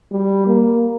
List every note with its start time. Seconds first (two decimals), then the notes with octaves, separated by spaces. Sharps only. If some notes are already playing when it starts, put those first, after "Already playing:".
0.12 G3
0.46 A#3